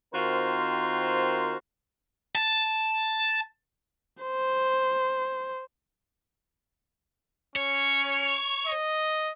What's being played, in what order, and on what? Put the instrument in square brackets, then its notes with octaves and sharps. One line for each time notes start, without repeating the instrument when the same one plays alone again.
[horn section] D#3 C4 F4 F#4 A#4 C5
[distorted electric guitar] A5
[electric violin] C5
[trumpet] C#4 [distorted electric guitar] C#5
[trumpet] D#5